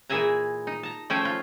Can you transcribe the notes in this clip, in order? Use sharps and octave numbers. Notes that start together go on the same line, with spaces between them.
A#2 E3 G#4 E5 G#5 A#5
D#4
A5 A#5
F3 A3 C#4 C5 G5 G#5
F4